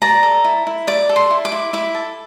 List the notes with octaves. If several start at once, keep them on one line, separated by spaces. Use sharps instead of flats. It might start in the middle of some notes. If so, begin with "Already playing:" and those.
D5 A#5
A4
E4
E4
D5 D6
A4
C6
E4
D6
E4
E4 D6
A4